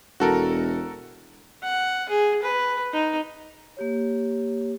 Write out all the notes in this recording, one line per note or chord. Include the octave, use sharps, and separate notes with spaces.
E1 F#4 A4 A#4
F#5
G#4
B4
D#4
A#3 G4 C#5